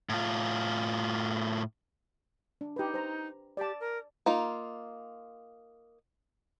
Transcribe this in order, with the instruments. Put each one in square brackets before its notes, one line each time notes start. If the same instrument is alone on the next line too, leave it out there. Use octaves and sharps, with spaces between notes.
[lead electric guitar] A2 F4
[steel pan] D4
[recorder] D#4 [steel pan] G4 B4
[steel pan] C5 A#5
[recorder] G4 [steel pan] D5 A5
[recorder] A#4
[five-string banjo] A#3 D#4 F4